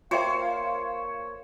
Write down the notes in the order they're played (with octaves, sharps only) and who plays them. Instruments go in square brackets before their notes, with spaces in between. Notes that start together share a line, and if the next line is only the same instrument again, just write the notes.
[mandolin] A#3 C5 [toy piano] F4 E5 G5 [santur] C#5 [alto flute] F5